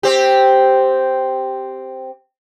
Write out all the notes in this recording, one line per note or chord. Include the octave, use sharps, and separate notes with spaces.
C4 G4